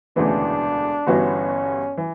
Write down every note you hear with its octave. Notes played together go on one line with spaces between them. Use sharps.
E1 D2 C#3 E3 B3 D4
G1 G2 E3 B3 C#4 F#4
E3